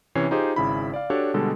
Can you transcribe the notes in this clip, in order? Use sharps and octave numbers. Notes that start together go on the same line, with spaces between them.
C3 E3 C#4 C#5 C7
D#4 F4 G4 G#4 C5
G#1 C#3 E4 B5
D5 F5
D4 F#4 G4 A4 C#5
B2 D3 G3 G#3 A4